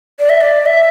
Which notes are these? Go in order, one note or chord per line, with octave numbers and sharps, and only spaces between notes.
D5
E5
D5
E5